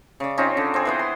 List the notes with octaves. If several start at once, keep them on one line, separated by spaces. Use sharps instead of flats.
C#3 D5
C4 C#4 D#4 F4
D3
C4 G#4
E3 B3 C5
C6